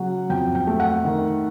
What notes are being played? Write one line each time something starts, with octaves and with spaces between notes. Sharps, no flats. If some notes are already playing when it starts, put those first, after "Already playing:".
Already playing: C#3 F#3 F#5
F2 G5
G5
A3
F#5
D#3